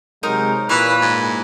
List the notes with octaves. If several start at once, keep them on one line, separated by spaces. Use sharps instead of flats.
C3 F#3 G#3 D#4 A#4 C5
A#2 E3 B4 C#5
G#2